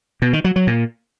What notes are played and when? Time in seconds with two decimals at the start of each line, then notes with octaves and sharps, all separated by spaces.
0.22 B2
0.33 D#3
0.44 F#3
0.56 F#3
0.67 A#2